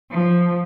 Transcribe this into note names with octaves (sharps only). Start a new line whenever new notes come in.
F3